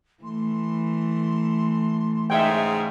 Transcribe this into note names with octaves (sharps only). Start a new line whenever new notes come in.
E3 A3 C6
G#2 C#3 G#3 E5 G5